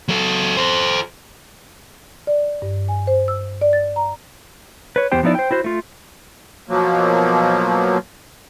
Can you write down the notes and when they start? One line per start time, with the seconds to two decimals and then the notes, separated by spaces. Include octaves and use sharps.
0.08 F#3 A4
0.57 A4 C5
2.27 D5
2.62 G2
2.89 G#5
3.07 C5
3.28 E6
3.61 D5
3.73 A6
3.96 A#5
4.96 B4 C#5
5.12 E2 E3 B3 G4 C5 G5
5.23 F3 B3 D#4 E4 D5
5.35 C5 G5
5.51 E4 F#4 C5
5.64 A3 F4
6.69 B2 F3 F#3 A#3